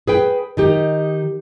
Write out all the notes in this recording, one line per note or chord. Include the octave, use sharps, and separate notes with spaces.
G#4 B4 G5
D#3 D#4 G4